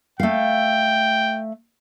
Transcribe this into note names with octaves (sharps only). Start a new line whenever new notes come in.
A3 F5 G5